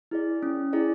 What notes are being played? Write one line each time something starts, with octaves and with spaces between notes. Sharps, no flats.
E4 G#4 D5
C#4
E4 G#4 D5